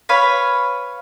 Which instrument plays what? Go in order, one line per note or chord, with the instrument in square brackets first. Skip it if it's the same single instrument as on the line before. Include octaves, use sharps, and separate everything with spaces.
[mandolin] B4 C#5 F5 B5